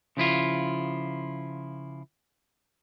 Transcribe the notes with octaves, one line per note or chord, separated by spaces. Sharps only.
C#3 F3 E4 F4